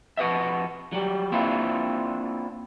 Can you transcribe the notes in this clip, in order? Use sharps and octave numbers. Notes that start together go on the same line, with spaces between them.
F2 F#4 B4 D#5 E5
F#3 G3
A#3 C4 D4 E4 F4